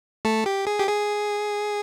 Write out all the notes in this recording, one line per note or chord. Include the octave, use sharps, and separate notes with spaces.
A3 A4
G4
G#4
G4
G#4